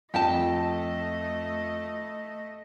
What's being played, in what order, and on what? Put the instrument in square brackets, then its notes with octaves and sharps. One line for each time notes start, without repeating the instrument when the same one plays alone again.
[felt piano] F2 [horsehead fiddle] A3 D#5 [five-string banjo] G4 G5 A5